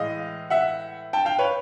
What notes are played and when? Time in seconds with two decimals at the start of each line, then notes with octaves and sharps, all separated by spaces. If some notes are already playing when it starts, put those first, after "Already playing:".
Already playing: A2 E3 G#3 D#5 F5
0.50 E5 F#5
1.13 G5 A5
1.25 F5 G5
1.39 B4 C#5